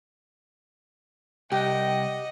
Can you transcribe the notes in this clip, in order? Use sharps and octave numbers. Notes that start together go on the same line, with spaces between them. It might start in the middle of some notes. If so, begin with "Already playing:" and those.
C2 G4 D#5 F#5 G5